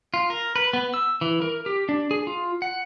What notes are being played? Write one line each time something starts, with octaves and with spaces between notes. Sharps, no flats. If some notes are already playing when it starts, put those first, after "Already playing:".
F4
A#4
B4
B3
E6
E3
A#4
G4
D4
G#4
F4
F#5